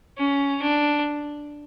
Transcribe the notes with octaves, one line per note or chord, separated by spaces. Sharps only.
C#4
D4